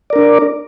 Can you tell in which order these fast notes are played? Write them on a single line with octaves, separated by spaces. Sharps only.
D5 A#4 D4